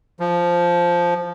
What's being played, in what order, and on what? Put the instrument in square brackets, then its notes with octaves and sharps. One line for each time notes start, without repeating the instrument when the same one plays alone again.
[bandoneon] F3